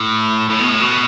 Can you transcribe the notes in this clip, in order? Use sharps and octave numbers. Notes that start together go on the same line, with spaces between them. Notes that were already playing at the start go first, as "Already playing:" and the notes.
Already playing: A2
A2
B2
A2
B2